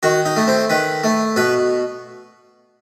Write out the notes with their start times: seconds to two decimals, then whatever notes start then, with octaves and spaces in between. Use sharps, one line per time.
0.03 D#3 F#4
0.26 D#4
0.36 A3
0.47 C4
0.70 D#3 B4
1.04 A3
1.36 B2 B4